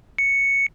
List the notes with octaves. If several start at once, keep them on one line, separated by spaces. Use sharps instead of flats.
C#7